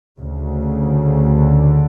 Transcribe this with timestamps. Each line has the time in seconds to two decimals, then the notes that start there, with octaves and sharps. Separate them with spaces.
0.19 D2 C#3
0.81 D3